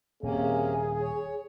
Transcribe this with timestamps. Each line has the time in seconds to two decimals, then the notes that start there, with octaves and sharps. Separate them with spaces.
0.23 D#1 C3 A#3 C#4 G#4
1.01 C#5